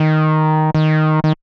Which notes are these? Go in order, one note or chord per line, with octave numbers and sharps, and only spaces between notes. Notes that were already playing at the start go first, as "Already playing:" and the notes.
Already playing: D#3
D#3
D#3